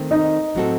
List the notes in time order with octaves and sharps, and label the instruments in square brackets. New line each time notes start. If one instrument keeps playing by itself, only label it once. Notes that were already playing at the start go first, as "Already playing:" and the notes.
Already playing: [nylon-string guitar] D#3 A3 C4
[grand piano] D#4
[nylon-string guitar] A2 F#3 C4 F#4 A4